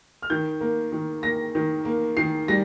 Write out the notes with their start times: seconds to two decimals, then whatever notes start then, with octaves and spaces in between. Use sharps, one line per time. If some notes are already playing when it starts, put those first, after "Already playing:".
0.22 F6
0.30 D#3 G6
0.61 A#3
0.92 D#3
1.23 A#3 A#6
1.55 D#3
1.85 A#3
2.17 D#3 C7
2.48 G3 A#6